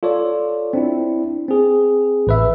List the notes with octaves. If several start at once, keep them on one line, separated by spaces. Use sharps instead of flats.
F4 A4 C#5 D5
C4 D4 E4
C4 G#4
A1 B4 E5